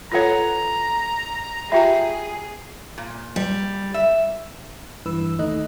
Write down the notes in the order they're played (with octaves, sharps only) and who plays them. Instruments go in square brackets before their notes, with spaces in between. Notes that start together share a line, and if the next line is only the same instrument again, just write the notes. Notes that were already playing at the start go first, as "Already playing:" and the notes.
[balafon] F4 A4 C#5 [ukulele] B4 F#5 [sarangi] A#5
[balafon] F4 G4 A#5 [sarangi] G#4 [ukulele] E5 G5
[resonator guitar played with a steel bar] A#2
[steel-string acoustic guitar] G3
[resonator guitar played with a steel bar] E5
[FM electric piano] G2 E3 B4 E6
D#2 A3 D#4 D#5 F#6